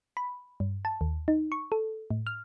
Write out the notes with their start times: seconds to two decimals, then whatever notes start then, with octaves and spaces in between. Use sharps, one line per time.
0.17 B5
0.60 G2
0.85 A5
1.01 D#2
1.28 D#4
1.52 C#6
1.72 A4
2.11 A2
2.27 F6